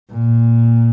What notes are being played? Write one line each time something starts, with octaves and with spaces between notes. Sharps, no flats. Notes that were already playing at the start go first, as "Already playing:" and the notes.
A#2